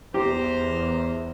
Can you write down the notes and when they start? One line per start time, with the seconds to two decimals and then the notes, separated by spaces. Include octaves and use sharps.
0.14 E2 G4 C5 A#5